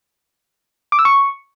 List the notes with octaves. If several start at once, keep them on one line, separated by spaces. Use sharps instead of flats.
D6
E6
C#6